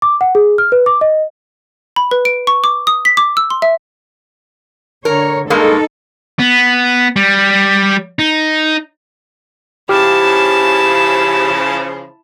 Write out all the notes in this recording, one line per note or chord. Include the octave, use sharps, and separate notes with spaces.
D6
F#5
G#4
F6
B4
D6
D#5
B5
B4
D7
C#6
D6
D#6
B6
D6
E6
C6
E5
D3 A#4 C#5
G2 G#3 A#3 D#4 A4
B3
G3
D#4
C#3 F3 E4 G4 A5 F6